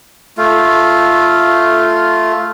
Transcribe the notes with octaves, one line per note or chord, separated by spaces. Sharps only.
A3 F4